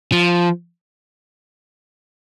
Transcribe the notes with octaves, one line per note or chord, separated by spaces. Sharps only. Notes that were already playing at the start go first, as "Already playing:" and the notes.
F3